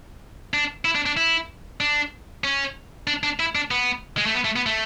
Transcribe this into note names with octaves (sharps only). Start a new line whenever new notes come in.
D4
E4
D4
D4
E4
D4
C#4
D4
D4
E4
D4
B3
G#3
A3
B3
A3
B3
A3